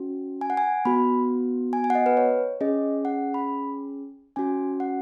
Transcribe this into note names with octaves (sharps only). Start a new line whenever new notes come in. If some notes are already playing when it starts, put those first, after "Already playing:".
Already playing: C#4 F#4
G#5
F#5
G#5
B3 F#4 B5
G#5
G#5
F#5
D#5
B4
C#5
C#4 G#4 D#5
F#5
B5
C#4 F#4 G#5
F#5